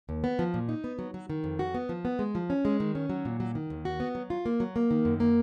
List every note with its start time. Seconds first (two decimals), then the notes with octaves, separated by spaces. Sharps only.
0.09 D#2
0.24 B3
0.39 F3
0.54 A#2
0.69 D#4
0.84 B3
0.99 F#3
1.14 F#3
1.30 D#3
1.44 F2
1.59 F#4
1.75 B3
1.89 F3
2.05 B3
2.19 G#3
2.35 F3
2.50 C#4
2.65 G#3
2.80 D#3
2.95 C#4
3.09 F#3
3.25 A#2
3.40 F#3
3.55 D#3
3.70 D#2
3.85 F#4
4.00 B3
4.15 F#3
4.30 F4
4.46 A#3
4.60 F#3
4.76 A#3
4.91 D#3
5.05 F#2
5.20 A#3